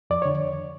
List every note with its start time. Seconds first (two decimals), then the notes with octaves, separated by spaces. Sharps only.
0.10 F2 D5
0.22 D3 C#5